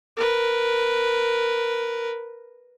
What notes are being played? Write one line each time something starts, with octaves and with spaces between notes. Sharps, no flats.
A#4 B4